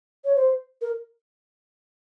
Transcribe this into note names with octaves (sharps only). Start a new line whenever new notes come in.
C#5
C5
A#4